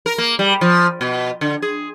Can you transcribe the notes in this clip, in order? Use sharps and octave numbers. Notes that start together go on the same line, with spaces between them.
A#4
A#3
G3
F3
B2
D3
G#4